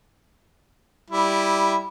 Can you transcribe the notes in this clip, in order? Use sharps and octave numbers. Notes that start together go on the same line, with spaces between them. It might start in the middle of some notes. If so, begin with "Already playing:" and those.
G3 E4